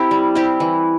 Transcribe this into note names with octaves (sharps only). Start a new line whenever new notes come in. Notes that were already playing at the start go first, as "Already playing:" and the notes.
Already playing: C4 E4 G4
G3
C4 E4 G4
E3